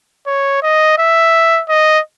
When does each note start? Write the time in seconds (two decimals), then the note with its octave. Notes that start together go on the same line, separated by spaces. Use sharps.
0.27 C#5
0.63 D#5
0.98 E5
1.69 D#5